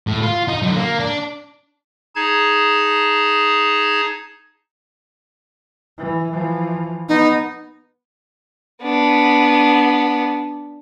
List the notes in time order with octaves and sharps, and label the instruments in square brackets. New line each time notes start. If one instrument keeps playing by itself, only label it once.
[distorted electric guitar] A2
F4
D#4
D3 F#3
A#3
D4
[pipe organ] D#4 G#4 A5 G#6
[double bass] E3
E3 F3
[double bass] B3 [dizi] D#4
[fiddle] B3 D4